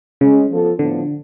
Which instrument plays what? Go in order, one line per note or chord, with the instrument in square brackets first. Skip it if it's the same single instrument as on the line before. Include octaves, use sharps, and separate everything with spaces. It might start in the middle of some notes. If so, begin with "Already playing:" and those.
[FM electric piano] C#3 [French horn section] G#3 C#4 G#4
[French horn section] F3 B3 F4 A4
[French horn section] A2 F3 B3 D4 [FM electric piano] D3